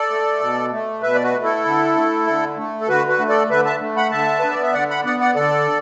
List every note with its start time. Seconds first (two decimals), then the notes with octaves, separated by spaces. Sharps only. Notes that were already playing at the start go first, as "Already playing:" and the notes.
Already playing: A4 D5
0.10 A3
0.40 B2
0.71 A3
1.02 B2 B4 E5
1.14 D5
1.23 F#4 B4
1.33 A3
1.44 E4 A4
1.65 D3
1.96 A3
2.27 D3
2.57 A3
2.81 A4
2.88 D3 F#4 B4
3.09 F#4 B4
3.18 A3
3.29 A4 D5
3.50 D3 B4 E5
3.65 E5 A5
3.80 A3
3.96 F#5 B5
4.11 D3 E5 A5
4.39 B3 B4
4.51 D5
4.63 E5
4.73 D3 D5 F#5
4.90 F#5 B5
5.04 B3 D5 F#5
5.21 D5 F#5
5.35 D3 A4 D5